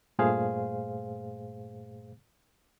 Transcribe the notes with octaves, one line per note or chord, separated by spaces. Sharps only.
G2 A#2 A3 G#4 C5 F5